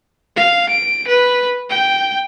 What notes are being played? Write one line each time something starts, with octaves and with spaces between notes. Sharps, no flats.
F5
D7
B4
G5